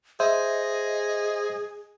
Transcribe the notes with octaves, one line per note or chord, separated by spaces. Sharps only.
G#4 C5 D#5 E5